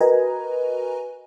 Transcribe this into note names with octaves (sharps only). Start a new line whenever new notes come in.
F#4 A#4 B4 D#5 G#5 A#5